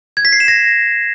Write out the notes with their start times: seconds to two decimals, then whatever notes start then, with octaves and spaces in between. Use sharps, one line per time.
0.17 G#6
0.25 B6
0.33 C7
0.40 E7
0.48 A#6